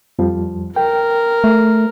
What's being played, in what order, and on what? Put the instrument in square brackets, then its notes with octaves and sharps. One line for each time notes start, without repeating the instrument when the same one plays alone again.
[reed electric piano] F2 F3 G3
[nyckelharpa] A#4 [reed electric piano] G5
[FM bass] A3